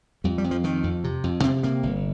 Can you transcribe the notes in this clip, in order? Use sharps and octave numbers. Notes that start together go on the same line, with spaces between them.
F2 G3
G3
F2
F3
F2 D#3
F2
C3
F2
C3 C4
C3 A#3
G1